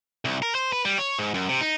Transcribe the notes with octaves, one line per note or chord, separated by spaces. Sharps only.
C2
A#4
C5
B4
G3
C#5
G#2
F#2
C3
D#4